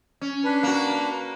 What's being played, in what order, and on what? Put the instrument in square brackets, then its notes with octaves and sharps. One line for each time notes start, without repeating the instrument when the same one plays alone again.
[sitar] C#4
[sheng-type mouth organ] D4 B4
[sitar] A#3 F#4